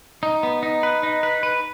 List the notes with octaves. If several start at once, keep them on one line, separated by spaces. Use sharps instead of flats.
D#4
B3
D#4
B4
D#4
B4
B4